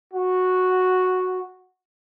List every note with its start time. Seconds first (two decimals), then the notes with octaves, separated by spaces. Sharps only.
0.14 F#4